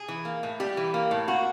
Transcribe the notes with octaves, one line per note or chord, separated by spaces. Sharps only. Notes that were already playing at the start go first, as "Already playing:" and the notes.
Already playing: G#4
E3
A#3
A2
G3 G4
E3
A#3
A2
A#3 F#4